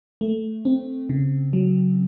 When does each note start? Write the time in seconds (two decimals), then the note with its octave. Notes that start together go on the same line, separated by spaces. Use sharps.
0.21 A3
0.65 C4
1.09 C#3
1.53 F#3